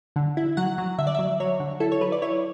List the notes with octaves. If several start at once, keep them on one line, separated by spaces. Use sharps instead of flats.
D3
E4
F#3 F#5
F#3
D3 E5
D5
F#3 E5
F#3 C#5
D3
E4 A4
C#5
F#3 B4
D5
E4 C#5